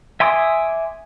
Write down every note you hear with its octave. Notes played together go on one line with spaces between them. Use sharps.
E5 G#5 C6 D6 D#6